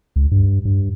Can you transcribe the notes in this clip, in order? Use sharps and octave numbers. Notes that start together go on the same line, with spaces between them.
C#2
G2
G2